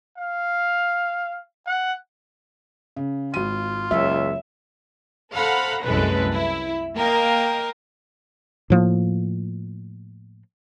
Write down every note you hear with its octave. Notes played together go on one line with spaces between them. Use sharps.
F5
F#5
C#3
G#1 F4 D#7
F#1 C#2 C#5 E5
A4 C5 F5 F#5 A#5 B5
C2 F#2 A2 G#3 A4 B4
E4
A#3 A#4 D#5 F5 G5
A2 F3 A#3